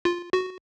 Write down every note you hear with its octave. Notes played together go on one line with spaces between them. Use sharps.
F4
F#4